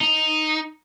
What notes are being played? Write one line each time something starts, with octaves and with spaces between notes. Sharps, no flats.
D#4